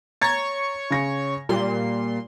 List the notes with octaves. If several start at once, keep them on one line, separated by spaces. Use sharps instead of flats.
C#5 A#5 C#6 G#6 A6
C#3 A#6 C#7
A#2 G3 C6